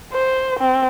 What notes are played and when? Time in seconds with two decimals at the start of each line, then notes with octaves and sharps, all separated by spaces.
0.13 C5
0.59 C4